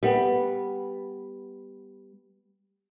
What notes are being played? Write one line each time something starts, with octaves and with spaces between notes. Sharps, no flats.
G3 B3